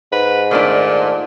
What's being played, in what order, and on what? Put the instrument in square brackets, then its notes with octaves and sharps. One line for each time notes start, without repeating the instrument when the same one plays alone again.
[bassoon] G#2 [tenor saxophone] B4
[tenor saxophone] A#2 [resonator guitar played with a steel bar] D#3 A3 D4